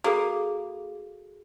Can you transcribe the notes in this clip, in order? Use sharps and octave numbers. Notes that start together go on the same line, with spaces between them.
A#3 F#4 G#4 A4